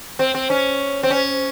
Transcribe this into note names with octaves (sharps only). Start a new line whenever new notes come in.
C4
C4
C#4
C4
C#4